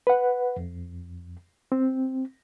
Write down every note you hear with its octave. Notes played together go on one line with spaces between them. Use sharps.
B4 F#5
F2
C4